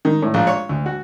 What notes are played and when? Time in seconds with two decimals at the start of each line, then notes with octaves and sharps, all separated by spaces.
0.05 D#3
0.22 A2
0.34 A#1
0.47 C#5
0.69 D2
0.86 F#4